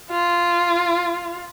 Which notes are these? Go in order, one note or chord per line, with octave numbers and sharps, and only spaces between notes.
F4